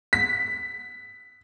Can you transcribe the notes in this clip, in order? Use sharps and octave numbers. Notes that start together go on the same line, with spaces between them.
B6